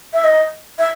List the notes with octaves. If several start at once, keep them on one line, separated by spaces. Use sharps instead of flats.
E5
D#5
E5